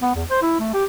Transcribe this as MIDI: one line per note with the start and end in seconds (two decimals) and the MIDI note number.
0.02 0.11 59
0.15 0.24 40
0.30 0.39 72
0.42 0.57 64
0.59 0.71 57
0.73 0.84 67